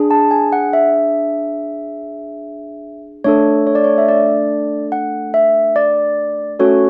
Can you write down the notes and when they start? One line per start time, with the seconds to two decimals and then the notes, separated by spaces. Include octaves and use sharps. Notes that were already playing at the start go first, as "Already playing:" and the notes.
Already playing: D4 G#4
0.11 A5
0.31 G#5
0.53 F#5
0.73 E5
3.24 A3 D4 A4 C#5
3.67 C#5
3.75 D5
3.84 C#5
3.98 E5
4.08 D5
4.92 F#5
5.34 E5
5.76 D5
6.59 A3 C#4 F#4 A4 C#5